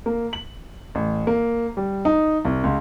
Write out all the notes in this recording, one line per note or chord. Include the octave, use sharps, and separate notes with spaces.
A#3
F#7
A1
A#3
G3
D#4
C2
C#2